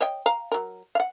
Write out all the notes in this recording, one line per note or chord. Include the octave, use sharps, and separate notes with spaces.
C#5 D#5 G5
F5 A#5
F#3 A#4
F5 F#5